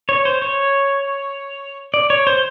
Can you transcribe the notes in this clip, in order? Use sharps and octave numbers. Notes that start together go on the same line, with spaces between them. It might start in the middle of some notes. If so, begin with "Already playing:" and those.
C#5
C5
C#5
D5
C#5
C5